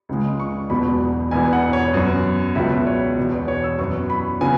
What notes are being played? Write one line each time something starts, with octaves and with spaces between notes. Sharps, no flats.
C#2 C#3 G#3
C#6
E1 E2 B2 F#3 B3 B5
E1 E2 E3 B3 G#5
F#5
C#5
F#2 F#3 B3
C#2 B2 F#3 B3 E5
C#5
E1 E2 B2
B4
C#5
E6
F#2 E3 B3 C#6
B5
C#3 F#3 B3 G#5